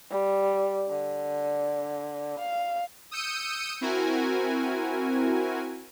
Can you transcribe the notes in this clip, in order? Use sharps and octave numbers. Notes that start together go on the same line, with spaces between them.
G3
D3
F5
D#6 E6 G6 C#7 D#7
C4 E4 F#4 A#4 G#5